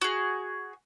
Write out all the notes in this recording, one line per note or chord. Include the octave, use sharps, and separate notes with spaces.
F#4 G#4